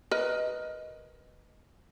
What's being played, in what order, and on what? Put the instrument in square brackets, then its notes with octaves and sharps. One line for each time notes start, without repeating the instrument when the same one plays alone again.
[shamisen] A#4 B4 D#5